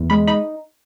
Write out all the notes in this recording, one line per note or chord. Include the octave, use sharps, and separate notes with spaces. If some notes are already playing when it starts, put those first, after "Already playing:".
Already playing: E2
G#3 B5
D#4 B5